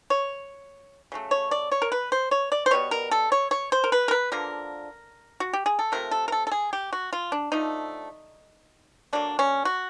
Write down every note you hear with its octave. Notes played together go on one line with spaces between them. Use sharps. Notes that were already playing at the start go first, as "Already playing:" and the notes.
C#5
C#3 F#3 A3
C#5
D5
C#5
A#4
B4
C5
C#5
D5
C5
B2 G3 B3 C#5
A#4
A4
C#5
C#5
C5
A#4
B4
A#4
B4
D3 F3 A#3 A#4
F#4
G4
G#4
A4
C3 F3 A3 A#4
A4
A#4
A4
A4
G#4
G4
F#4
F4
D4
D3 F3 A3 D#4
D3 F#3 A#3 D4
C#4
F#4